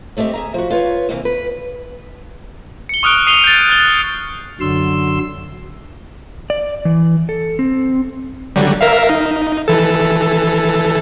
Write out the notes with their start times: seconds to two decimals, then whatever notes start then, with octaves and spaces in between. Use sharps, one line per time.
0.17 G#3 A3 C4 G4 E5
0.33 G#4 E5 A#5
0.54 F3 F#4
0.70 F4 B4 C#5
1.09 C3 E3 A#3
1.25 B4
2.89 C#7 G7
3.03 C#6 D#6 F6 F#6 D7
3.27 D#6 C7 D#7 F7 G7
3.44 G6 A6
3.70 F#6 G7
4.60 F#2 D3 F#3 C6 E6
6.50 D5
6.85 E3
7.29 A4
7.59 C4
8.56 D3 F#3 G3
8.81 A#4 E5 F5
9.10 D#4
9.68 E3 A4